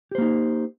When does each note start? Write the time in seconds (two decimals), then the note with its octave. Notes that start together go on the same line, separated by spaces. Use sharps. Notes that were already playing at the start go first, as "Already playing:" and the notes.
0.11 G4
0.15 C5
0.18 A#3
0.22 D#4